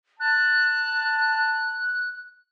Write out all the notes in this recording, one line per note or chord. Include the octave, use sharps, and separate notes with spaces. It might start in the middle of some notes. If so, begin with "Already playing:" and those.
A5 F#6